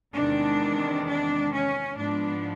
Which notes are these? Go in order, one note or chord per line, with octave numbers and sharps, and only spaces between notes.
E2 C3 D#3 G#3 D4
D4
C#4
G#2 F3 G#3 B3 D4